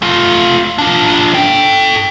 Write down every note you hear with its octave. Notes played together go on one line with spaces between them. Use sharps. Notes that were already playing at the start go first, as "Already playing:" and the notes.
A3 F4
D4 F4
A4 G5